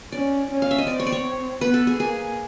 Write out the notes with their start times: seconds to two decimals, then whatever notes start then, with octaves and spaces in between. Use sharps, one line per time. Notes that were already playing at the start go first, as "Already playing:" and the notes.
0.12 C#4 D5
0.51 C#4
0.62 F5
0.71 E5
0.78 D#5
0.87 C4 D5
1.00 C#5
1.07 D5
1.12 C#5
1.61 B3 B4
1.74 A4
1.87 G#4
2.00 A#3 G#4